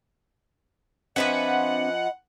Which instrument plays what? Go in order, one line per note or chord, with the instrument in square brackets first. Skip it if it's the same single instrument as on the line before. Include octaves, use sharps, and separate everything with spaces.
[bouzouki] F3 B4 G#5 [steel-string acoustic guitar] C4 D4 E5 [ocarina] D#5 [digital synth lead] F#5